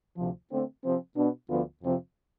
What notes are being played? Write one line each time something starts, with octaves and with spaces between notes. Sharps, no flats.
D2 C3 F3
D3 A3 C4
C3 F3 C4
B2 B3 D4
D2 D3 F3 B3 F4
F2 C3 F3 C4 F4